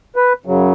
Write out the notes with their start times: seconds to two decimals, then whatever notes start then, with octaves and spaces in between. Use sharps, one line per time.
0.16 B4
0.45 F#2 C#3 F#3